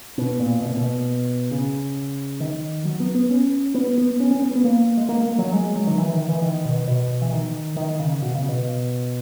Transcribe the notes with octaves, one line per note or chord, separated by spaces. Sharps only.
B2
A#2
B2
A#2
B2
C#3
D#3
F#3
B3
B3
C#4
B3
B3
C#4
C#4
B3
B3
A#3
G#3
A#3
A#3
F#3
G#3
F#3
D#3
E3
D#3
E3
D#3
B2
B2
E3
D#3
D#3
C#3
B2
C#3
B2